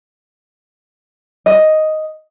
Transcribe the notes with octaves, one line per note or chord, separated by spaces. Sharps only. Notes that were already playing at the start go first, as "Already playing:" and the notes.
D#5